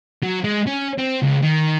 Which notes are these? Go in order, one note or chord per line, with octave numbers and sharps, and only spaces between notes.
F#3
G#3
C#4
C4
C#2
D#3